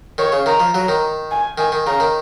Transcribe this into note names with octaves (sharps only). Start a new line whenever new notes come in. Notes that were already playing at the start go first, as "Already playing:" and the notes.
D#3 C#5
C#3
D#3 A#5
F3
F#3 A#5
D#3
G#5
D#3 G#5
D#3
C#3 A#5
D#3